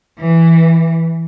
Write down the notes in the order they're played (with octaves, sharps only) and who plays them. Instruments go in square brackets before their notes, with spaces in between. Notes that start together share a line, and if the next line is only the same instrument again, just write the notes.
[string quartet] E3